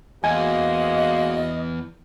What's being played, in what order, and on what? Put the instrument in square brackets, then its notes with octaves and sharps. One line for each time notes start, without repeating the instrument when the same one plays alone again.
[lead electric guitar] E2 [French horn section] G#3 A#3 F#4 [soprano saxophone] D#5 [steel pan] G#5